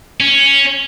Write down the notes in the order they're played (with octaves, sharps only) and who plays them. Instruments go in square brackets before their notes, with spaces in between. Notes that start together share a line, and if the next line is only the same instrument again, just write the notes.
[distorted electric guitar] C#4